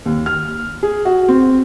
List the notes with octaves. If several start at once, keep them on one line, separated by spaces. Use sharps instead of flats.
D#2
F6
G#4
F#4
C4